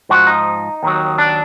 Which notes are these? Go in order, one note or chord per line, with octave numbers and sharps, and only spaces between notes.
G#2 F3 F#4
D#4
D#2 D#3 F#3
D4